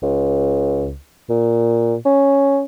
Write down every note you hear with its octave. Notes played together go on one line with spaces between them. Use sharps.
C#2
A#2
C#4